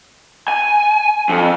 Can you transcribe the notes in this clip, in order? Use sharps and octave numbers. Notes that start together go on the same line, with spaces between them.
G#5
F2